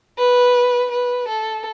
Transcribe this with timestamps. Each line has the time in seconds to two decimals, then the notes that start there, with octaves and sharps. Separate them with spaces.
0.18 B4
0.91 B4
1.28 A4